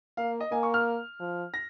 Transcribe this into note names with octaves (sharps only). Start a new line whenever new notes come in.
A#3 F5
D#5
A#3 G#5
C#6
F6
F3
A#6